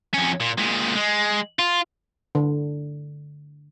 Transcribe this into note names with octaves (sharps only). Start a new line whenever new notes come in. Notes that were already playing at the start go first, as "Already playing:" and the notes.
F2 C#4
A#2
A#2 G#3
G#3
F4
D3